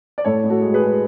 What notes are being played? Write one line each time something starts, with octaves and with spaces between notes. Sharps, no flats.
D5
A2 A4 C#5
A2
F#4 A4
G#3
G#4 B4
G#3